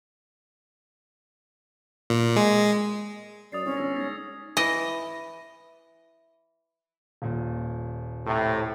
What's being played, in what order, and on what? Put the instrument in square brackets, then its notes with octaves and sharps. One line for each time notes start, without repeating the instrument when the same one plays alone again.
[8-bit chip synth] A#2
G#3
[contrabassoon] F#2 [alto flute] D5 [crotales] D#6 A6 C7
[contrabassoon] C2 [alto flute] C#4
[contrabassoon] G1 [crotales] E6 A#6
[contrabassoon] G#2 [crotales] G#6 A#6
[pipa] E3 [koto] D#5
[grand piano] D#1 A#2
[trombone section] A2 C3